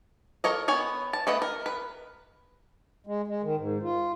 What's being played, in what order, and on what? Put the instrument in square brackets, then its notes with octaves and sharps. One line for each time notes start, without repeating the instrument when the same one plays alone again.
[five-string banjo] A4 A#4 C#5 D#5
B3 C#5 G#5
A5
A3 B4 D#5 F#5
A#4
B4
[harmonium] G#3
G#3
D#3
G#2
F4